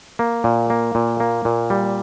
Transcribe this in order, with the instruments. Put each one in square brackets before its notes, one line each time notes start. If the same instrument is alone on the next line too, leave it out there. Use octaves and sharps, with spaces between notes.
[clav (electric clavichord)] A#3
A#2
A#3
A#2
A#3
A#2
G3